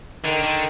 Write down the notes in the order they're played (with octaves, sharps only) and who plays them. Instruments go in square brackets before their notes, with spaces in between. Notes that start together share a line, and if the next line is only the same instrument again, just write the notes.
[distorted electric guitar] D3 [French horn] D#3
[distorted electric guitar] D3